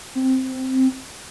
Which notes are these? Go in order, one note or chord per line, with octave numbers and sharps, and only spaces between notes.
C4